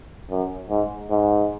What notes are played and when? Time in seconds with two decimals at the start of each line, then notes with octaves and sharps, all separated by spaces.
0.30 F#2
0.70 G#2
1.10 G#2